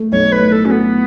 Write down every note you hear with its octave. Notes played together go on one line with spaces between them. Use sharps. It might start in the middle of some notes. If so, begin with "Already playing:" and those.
Already playing: A3
B1 C#5
B4
A2
A4
F#3 C#4
B3